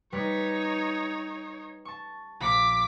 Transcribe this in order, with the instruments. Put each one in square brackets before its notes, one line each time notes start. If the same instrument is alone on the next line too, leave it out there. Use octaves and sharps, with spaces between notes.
[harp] G3 B4 [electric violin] D#4 C#5
[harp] A5 C#6
[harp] A#1 [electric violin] D6 B6